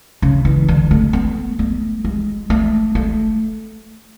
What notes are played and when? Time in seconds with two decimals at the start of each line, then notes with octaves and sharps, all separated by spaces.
0.22 C#3
0.45 E3
0.68 D3
0.91 A3
1.13 B3
1.59 A3
2.05 G#3
2.50 A3
2.95 A3